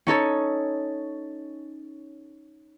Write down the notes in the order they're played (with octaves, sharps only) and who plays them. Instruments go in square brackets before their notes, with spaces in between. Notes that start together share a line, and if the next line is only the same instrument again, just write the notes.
[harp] C#4 D#4 A4 C#5